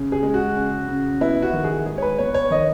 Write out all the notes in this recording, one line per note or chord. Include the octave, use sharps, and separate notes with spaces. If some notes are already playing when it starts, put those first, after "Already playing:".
Already playing: C#3
G#4
G#3
F#4
C#3
C#3
B3 E4
F#4
D#3
G#4
G#3 G#4
C#5
B4
B3 C#5
C#5
D#3 D#5